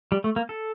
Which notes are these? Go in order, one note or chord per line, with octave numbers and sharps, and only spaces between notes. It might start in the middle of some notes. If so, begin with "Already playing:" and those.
G3
A3
A#3
A4